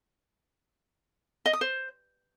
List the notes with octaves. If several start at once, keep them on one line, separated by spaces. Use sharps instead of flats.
D#5
D#6
C5